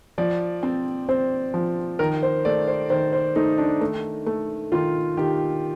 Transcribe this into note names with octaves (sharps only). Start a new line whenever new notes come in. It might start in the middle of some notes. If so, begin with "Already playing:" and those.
F3 D5
C4
C4 C5
F3
D#3 A#4
C5
A3 D5
C5
D#3 C5
C5
A3 D#4
D4
A3
A3
D#3 F4
D#3 G4